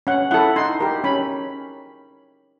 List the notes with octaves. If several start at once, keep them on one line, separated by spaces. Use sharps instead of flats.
C#4 F#5
E4 A4 F#5
D#4 C6
G4 A#4
C#4 B5